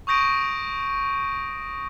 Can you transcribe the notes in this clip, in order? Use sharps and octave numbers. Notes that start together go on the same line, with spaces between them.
C#6 D#6 G6 A#6 D7 D#7